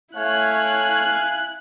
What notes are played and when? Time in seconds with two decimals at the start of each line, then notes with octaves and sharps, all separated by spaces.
0.15 A3 E4 C#5 F5 G#5 F#6